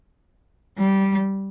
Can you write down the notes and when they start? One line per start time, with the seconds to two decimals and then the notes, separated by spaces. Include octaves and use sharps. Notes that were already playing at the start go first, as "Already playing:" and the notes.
0.78 G3